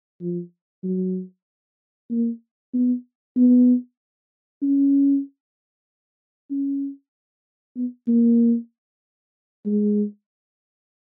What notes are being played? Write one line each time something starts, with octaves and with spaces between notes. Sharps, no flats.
F3
F#3
A#3
B3
B3
C#4
C#4
B3
A#3
G#3